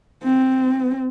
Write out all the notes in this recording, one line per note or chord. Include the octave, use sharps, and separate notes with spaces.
C4